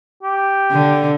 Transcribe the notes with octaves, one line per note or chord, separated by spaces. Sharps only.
G4
D3